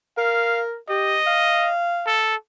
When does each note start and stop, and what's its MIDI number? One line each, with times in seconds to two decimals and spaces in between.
0.18 0.76 70
0.18 0.63 77
0.89 1.17 67
0.89 1.72 75
1.27 2.24 77
2.07 2.36 69